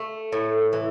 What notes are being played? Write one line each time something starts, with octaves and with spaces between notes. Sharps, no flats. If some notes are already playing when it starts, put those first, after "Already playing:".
Already playing: A3
A2
E3